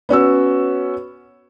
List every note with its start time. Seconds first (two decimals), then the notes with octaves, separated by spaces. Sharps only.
0.09 B3 C#4 F#4 E6